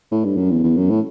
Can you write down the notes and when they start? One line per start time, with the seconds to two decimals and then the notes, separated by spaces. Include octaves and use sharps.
0.11 A2
0.25 G2
0.37 F#2
0.50 E2
0.64 E2
0.77 F#2
0.90 A2